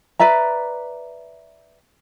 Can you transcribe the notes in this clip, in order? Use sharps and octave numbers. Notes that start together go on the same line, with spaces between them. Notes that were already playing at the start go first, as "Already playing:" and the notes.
B4 D5 E5 A#5